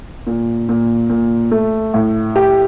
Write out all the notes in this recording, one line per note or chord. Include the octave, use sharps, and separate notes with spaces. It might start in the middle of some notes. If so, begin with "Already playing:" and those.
A#2
A#2
A#2
A3
A2
G4